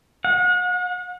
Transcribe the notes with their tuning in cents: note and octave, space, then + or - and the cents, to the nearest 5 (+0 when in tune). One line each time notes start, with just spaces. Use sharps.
F#5 -40